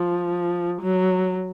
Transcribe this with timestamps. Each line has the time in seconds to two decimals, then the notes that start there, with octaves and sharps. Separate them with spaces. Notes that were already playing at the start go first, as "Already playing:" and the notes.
Already playing: F3
0.82 F#3